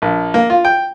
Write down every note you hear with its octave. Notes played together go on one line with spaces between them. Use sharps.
A#1
A#3
F4
G5